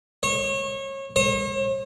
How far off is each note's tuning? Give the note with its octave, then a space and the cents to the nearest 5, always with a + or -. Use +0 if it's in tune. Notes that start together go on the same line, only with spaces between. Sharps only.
C#5 -30
C#5 -45